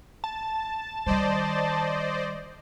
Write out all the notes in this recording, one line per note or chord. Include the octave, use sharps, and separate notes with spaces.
A5
D#3 G3 C5 D5 D#5